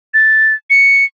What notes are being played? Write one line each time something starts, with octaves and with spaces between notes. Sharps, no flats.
A6
C#7